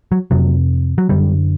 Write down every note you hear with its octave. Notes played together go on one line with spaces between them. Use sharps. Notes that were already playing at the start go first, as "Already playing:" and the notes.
F#3
F2 C3 F#3
F#3
F#2 D3 G3